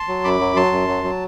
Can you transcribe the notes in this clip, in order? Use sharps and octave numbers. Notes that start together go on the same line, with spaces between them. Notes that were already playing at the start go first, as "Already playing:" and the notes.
Already playing: A5 C6
F#3
F#2 B5 D6
F#3
F#3 A5 C6
F#2
F#3
F#3